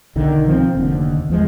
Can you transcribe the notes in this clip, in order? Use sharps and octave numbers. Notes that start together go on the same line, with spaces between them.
B1 D3 D#3
F3 B3 C4
F1 D#2 D3
E2 F3 G#3